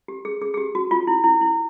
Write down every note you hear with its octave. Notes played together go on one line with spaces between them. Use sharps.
G4
G#4
G#4
G#4
G4
F#4
F4
E4
E4
E4